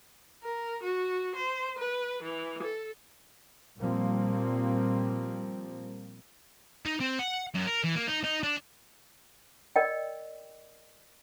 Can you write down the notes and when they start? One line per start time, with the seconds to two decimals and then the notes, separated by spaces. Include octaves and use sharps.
0.43 A#4
0.82 F#4
1.35 C5
1.78 B4
2.23 E3
2.63 A4
3.79 A#2 F3 G3 A#3 C4
6.86 D#4
7.01 C4
7.19 F#5
7.54 F#2
7.67 A#4
7.84 E3
7.95 A#3
8.07 D#4
8.24 D#4
8.43 D4
9.76 A#4 D5 D#5 G5